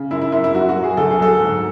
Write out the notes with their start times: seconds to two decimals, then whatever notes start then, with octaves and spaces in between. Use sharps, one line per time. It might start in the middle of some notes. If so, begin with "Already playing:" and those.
Already playing: C#3
0.11 F#2 E4
0.21 E4
0.32 F#2 E4
0.44 E4
0.54 F#3 F#4
0.69 F#4
0.76 F#3
0.84 G#4
0.97 D2 A4
1.11 G#4
1.19 F#3 A4
1.40 G#2